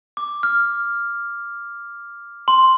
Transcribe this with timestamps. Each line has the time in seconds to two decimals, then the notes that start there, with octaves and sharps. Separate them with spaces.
0.17 D6
0.43 F6
2.48 C6